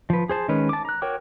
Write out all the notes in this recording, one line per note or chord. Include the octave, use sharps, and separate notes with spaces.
F3 B4
G#4 C5 A5
D#3 G#3 C#4 B4
A5 D6
A#5 F#6
F#4 A#4 C#5 G5 D6